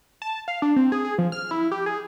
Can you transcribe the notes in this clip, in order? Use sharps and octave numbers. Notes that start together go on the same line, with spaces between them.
A5
F5
D4
C4
G#4
G#4
F3
F6
E4
G4
G#4